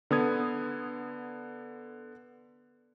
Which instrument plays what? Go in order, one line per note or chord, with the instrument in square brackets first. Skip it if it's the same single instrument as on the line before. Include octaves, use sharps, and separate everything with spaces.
[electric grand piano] D3 B3 D#6 G#6